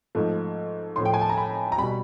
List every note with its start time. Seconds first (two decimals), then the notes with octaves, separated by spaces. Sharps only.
0.15 G#2 F3 A3
0.96 A2 F3 A3 C6
1.06 G5
1.14 G#5
1.21 A5
1.29 A#5
1.37 B5
1.72 A#5
1.78 B2 G3 B5